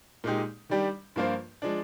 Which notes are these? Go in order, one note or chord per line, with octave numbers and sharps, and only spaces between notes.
A#2 G#3 D#4 G4
D#3 G3 D4 G4
G2 F3 A#3 F4 C5
F3 G#3 D4